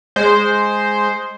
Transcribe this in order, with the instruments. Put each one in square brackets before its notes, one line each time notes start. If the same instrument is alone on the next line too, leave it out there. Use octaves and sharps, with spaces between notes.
[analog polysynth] G#3 C5